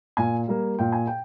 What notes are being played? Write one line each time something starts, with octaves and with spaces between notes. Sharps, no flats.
A#2 G#5
G3 A#3
A#2 G5
G#5
G5